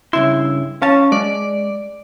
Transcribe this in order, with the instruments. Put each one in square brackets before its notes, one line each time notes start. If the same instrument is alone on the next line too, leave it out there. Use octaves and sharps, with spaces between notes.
[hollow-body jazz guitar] G2 C#3 C6 [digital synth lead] E4
[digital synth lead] C#4 [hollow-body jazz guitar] F5 A5
[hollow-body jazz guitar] G#3 [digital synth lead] D5